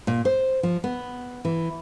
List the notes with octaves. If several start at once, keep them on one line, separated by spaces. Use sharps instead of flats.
A#2
C5
F3
B3
E3